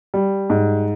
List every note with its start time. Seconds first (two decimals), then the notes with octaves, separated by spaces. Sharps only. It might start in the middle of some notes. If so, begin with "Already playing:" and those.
0.14 G3
0.50 G#2